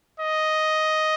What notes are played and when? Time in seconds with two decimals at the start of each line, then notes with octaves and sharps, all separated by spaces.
0.20 D#5